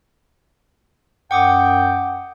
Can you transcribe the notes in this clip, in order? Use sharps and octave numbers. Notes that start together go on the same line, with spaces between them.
F#2 F#5 G5 D6 D#6